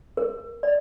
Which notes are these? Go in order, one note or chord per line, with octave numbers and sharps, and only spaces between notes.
A#4
D5